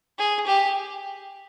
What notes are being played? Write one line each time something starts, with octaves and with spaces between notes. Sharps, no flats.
G#4
G4